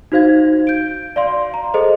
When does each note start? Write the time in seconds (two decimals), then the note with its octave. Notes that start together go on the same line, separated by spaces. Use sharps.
0.12 D#4 F#4 C5 F5 G#6
0.67 G6 D7
1.16 D5 F5 C6
1.54 A#5
1.74 G#4 A4 C5 D#5